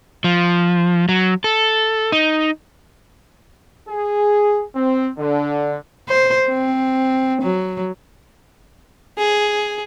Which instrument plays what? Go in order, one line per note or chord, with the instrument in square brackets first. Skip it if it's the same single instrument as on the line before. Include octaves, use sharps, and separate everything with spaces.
[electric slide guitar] F3
F#3
A4
D#4
[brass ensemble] G#4
C4
D3
[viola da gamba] C5
C4
F#3
[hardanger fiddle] G#4